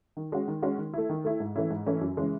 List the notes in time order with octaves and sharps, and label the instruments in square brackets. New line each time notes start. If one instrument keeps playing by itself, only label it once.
[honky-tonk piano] D#3
G#3 C#4 F#4
D#3
G#3 C#4 F#4
D#3
A3 E4
D#3
A3 E4
G#2
E3 A3 C#4 E4
G#2
E3 A3 C#4 E4
F#2
C#3 E3 G#3 C#4